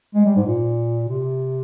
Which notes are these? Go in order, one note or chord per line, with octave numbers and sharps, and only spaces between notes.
G#3
G3
G#2
A#2
C3